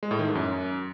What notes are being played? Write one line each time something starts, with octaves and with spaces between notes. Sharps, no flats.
G#3
A2
D#3
G#2
F#2